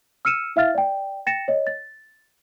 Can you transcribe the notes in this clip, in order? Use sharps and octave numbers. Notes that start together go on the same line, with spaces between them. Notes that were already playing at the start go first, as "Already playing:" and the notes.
E6 F6 C#7 D#7 E7
E4 E5 F5 F6 A6
D5 G5
G5 A6 A#6 C#7 E7
C#5 D#5
A6